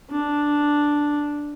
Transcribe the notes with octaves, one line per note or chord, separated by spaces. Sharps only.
D4